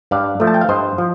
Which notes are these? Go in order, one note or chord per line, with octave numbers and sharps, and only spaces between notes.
G2 D5 F5
F3 A3
A5
G5
F5
G2 C5 D#5
F3